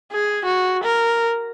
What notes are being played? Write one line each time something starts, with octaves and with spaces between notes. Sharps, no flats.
G#4
F#4
A#4